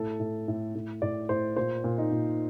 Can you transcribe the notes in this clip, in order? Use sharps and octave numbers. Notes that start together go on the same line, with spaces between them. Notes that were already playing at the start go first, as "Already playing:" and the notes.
Already playing: A2 A4
A2
A2
A2
A2 D5
A2 C5
A#2 C5
A#2
D#4
A#2